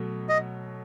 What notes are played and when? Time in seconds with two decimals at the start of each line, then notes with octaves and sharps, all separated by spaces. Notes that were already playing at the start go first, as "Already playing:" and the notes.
Already playing: B2 F#3 A3
0.29 D#5